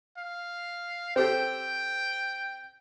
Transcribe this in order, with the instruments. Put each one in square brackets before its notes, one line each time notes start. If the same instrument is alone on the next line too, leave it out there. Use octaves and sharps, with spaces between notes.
[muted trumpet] F5
[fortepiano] C4 G4 A4 [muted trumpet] G5